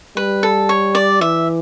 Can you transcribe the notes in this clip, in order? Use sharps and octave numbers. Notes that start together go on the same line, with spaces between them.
G3 B4
A4
C#5
D5
E3 E5